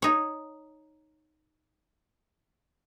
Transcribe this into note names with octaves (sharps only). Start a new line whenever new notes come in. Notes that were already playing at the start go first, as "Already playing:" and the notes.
D#4 C#5